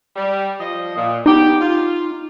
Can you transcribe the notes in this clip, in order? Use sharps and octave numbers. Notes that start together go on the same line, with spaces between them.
G3
F3 D#5
A#2
B3 D#4 G4
F4